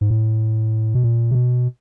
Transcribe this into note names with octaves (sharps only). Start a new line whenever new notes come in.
G#2
A2
B2
A#2
C3
B2